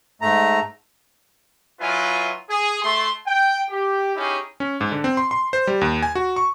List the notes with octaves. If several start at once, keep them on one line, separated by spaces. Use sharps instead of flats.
G#2 A3 A#5
F#3 E4 F4 B4 G#5
G#4
A3 C6
G5
G4
C#4 D#4 E4 G4 G#4
C#4
G#2
D3
C4
C6
C6
C5
G3
D#2
G#5
F#4
C#6